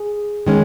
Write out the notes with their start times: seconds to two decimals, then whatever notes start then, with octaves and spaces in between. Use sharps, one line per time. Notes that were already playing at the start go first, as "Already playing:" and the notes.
Already playing: G#4
0.46 D#3 G#3 C#4